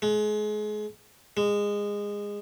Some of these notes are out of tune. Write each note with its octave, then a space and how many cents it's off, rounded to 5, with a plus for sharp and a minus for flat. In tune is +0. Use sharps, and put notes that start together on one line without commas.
G#3 +30
G#3 -20